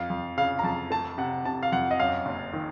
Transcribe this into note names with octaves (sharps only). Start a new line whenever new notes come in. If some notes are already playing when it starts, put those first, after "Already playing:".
Already playing: F2 F5
F2
C#3 F5
A#5
F2 A5
A3 A5
C3 F#5
C3 A5
F5
F2 F#5
D#5
F#2 F5
F#1
D#3